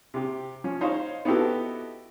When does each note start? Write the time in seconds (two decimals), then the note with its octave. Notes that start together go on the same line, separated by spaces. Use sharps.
0.14 C3 G4
0.64 F3 C#4
0.81 D#4 C5 C#5 F5
1.25 B3 D#4 E4 F#4 G4 A4